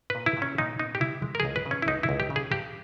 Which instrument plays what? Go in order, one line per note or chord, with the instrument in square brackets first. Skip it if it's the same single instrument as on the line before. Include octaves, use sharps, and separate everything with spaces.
[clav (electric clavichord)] A#2 B4
E4
A#2
C#4
A#2 D#4
B3 D#4
G4
G3 E4
G#3
A#4
G#4
C#2
B4
C#3
C#4
E4
C#2 D#4
E4
C#2
G4
C#3
G#4
G2 G4